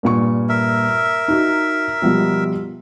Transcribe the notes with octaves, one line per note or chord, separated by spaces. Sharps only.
G2 A#2 C#6
A#4 E5
D#4 F#4
B2 F3 G3